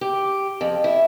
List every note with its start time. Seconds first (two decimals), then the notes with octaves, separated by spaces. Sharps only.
0.01 G4
0.61 F2
0.84 E4